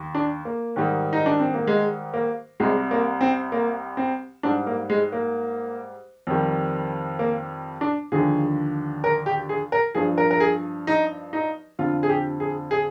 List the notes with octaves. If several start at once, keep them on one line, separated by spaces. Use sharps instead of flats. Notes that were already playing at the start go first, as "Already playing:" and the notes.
Already playing: D#2
D4
A#3
G#2 D#3 G3
D#4
D4
C4
A#3
G#3
A#3
C2 C3 G3 G#3
A#3
C4
A#3
C4
G#2 G3 D4
A#3
G#3
A#3
F2 D#3 G3
A#3
D4
D#2 D3 F3 G#4
A#4
G4
G#4
A#4
G2 F3 G#4
A#4
A#4
G#4
D#4
D#4
F2 D3 F3 F4
G#4
G4
G#4
G#4